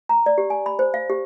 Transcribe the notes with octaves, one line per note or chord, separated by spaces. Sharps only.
A#5
D5
G4
G#5
B5
C5
F5
G4